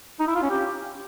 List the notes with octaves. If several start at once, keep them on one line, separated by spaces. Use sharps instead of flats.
D#4
E4
F4
C#4
G4